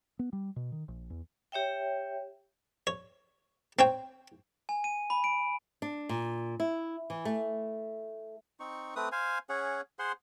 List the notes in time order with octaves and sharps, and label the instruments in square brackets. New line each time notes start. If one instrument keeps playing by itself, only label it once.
[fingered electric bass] B3
G3
B2
D#3
A#1
E2
[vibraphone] G4 C#5 E5 G5
[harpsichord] C#5
C4 C#5 G5
[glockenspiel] G#5
D#7
B5
D7
[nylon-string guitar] D4
A#2
E4
E3
A3
[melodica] C4 D#4 C#6
A3 C4 B4 D#6
C5 F5 G#5
C#4 G#4 C#5 F#5
G#4 C5 F#5 C6